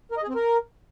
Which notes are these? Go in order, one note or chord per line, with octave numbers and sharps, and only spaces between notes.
A#4
D#5
G#4
C4
A#4